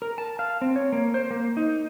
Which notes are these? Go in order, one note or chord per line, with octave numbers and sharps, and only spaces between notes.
A#4
A5
F5
C4
C#5
A#3
C5
A#3
D#4